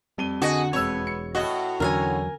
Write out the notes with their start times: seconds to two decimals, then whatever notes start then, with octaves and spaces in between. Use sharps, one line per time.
0.18 F2 G3 D#7 G7
0.42 D3 F#4 G#4 D#5
0.73 E1 F2 G#3 B3 C#5 E6
1.07 C#7
1.35 A2 C3 F#4 D#5
1.80 E2 D3 F#3 C#4 A#4 F5 G#5